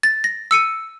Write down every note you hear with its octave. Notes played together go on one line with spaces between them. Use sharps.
A6
A#6
E6 C#7 D#7